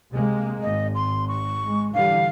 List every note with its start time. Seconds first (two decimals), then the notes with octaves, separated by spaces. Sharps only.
0.12 C3 G#3 A#3
0.63 G#1 D#5
0.95 C6
1.28 C#6
1.65 G#3
1.94 D3 E3 G3 F5